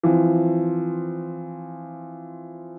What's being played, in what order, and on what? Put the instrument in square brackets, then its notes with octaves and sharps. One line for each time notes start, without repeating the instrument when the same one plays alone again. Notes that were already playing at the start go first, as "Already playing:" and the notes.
[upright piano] E3 F3 C4